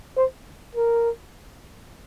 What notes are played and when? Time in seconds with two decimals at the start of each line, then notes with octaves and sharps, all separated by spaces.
0.17 C5
0.75 A#4